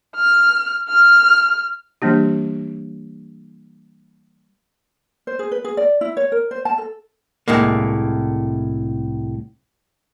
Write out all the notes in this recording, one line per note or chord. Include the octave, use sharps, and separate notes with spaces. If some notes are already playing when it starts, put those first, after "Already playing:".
F6
F6
E3 G3 A#3 D4 G4
C5
G#4
B4
G#4
D5
E4
C#5
A#4
C5
A5
A4
C2 A2 G#3 A#3